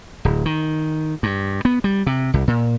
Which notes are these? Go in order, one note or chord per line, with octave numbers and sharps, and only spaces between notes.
D1
D#3
G2
B3
G3
C3
C2
A#2